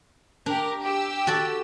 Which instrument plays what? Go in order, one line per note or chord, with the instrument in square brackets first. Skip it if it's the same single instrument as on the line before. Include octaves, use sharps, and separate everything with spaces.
[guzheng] D4 [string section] G4 A#4
[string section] G4 E6
[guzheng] F#4 A4 D5